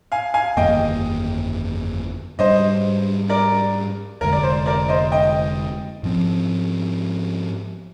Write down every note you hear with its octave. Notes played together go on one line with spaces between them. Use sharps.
F5 G#5
F5 G#5
G1 F2 D#3 A#3 D#5 G5
G#2 G3 D4 C5 D#5
A#4 D5
F1 F2 D3 G#3 A#4
D5
C5
A#4 D5
C5 D#5
D#5 G5
G#2 F3 C4